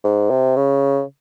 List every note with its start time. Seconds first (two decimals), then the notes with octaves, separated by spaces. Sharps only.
0.04 G#2
0.30 C3
0.56 C#3